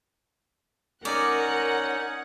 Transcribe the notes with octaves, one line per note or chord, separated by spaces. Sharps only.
C#4 D#4 A#4 C#5 D5 F#5